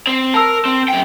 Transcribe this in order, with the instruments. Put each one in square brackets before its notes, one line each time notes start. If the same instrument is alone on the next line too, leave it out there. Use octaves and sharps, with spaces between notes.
[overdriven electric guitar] C4
[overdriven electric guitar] A#4 [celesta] A5 E6
[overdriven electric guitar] C4
F#2 G5